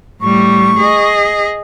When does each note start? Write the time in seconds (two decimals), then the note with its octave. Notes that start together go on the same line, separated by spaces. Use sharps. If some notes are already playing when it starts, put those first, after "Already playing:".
0.21 A2 G3 C#6
0.79 G#4 D#5